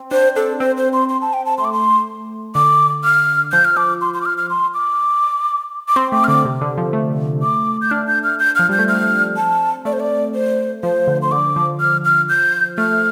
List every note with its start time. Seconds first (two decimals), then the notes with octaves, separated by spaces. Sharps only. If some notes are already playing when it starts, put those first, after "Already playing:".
Already playing: C4
0.11 D4 C5
0.36 D4 A4
0.60 C4 C5
0.77 C5
0.93 C6
1.09 C6
1.21 A5
1.33 G5
1.45 A5
1.58 A3 C6
1.64 D6
1.72 C6
2.55 D3 D6
3.04 F6
3.52 F3 G6
3.65 F6
3.77 F3 D6
4.01 C6
4.14 C6
4.21 D6
4.25 F6
4.38 F6
4.50 C6
4.74 D6
5.88 D6
5.96 C4 C6
6.12 A3 D6
6.24 F6
6.28 D3 D6
6.45 C3
6.61 D3
6.77 F3
6.93 A3
7.42 D6
7.81 G6
7.91 D4 F6
8.07 G6
8.24 F6
8.39 G6
8.55 F3 F6
8.69 G3 G6
8.79 A3
8.88 C4 F6
9.37 A5
9.85 A3 D5
9.93 C5
10.00 D5
10.34 C5
10.83 F3 C5
11.07 D3
11.22 C6
11.31 D3 D6
11.56 F3
11.80 F6
12.05 F6
12.29 G6
12.78 A3 F6